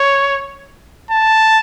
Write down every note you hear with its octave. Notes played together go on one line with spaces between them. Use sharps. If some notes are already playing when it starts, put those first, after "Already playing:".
Already playing: C#5
A5